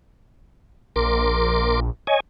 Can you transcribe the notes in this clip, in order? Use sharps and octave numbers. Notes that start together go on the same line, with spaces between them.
A#1 A#4 C6 D6
C#5 D#5 G#5